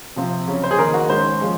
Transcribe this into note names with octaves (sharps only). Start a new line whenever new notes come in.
C3 F3 C4
C#3 F#3 C#4
C5
G#4
D#3 A#3 D#4 A#4
F#4
D#3 G#3 C#4 C5
F3 G#3 C#4